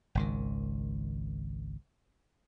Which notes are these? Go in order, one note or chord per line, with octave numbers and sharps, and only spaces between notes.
G#1 C#2 D#3